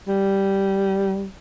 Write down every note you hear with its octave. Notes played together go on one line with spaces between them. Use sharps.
G3